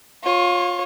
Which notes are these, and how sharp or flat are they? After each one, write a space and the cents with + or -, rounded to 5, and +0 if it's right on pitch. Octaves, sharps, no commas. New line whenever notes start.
F4 +25 C#5 -15